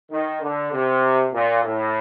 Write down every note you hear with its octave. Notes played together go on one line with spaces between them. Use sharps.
D#3
D3
C3
A#2
A2